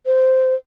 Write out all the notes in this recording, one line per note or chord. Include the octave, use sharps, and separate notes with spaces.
C5